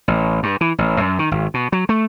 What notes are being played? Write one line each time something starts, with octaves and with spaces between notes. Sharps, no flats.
A1
G2
E3
A1
F#2
D#3
G#1
B2
F#3
A3